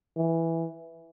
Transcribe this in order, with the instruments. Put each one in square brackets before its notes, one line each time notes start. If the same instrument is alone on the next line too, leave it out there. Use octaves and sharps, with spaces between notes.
[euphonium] E3